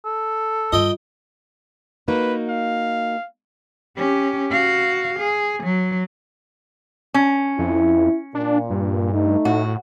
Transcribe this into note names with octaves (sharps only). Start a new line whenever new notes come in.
A4
G2 F4 D#5 G5
A#3 D#4 F#4 B4
F5
C#4 G4
F#4 F5
G#4
F#3
C#4
F2 E4
A#2 D4
G2
A3 D#4
A2 F#4